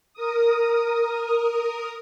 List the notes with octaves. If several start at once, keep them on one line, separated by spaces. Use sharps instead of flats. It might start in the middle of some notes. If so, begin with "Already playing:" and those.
A#4 D#6